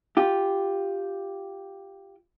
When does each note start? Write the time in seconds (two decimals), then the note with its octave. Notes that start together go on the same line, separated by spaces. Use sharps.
0.17 F4 G4